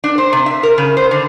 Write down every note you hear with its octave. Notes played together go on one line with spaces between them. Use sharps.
D4
C5
C3
E5
A#4
C#3
C5
D3